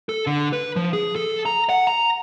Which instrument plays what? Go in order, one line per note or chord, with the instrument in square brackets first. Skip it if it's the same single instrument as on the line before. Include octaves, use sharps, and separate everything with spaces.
[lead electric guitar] A4
D3
B4
F3
G#4
A4
A#5
F#5
A#5